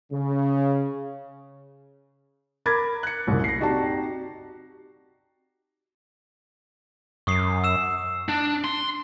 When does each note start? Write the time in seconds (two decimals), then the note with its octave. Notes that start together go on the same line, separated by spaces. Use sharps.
0.12 C#3
2.66 A#4 B5 D6 G#6 A6
3.03 F#6 C#7
3.27 F#1 C2 F#2 A#2
3.44 A#6 C7
3.59 C4 D#4 F#4 G4 D5 A5
7.27 F#2 C#6 D#6 C7
7.64 E6 E7
8.29 D4
8.64 C6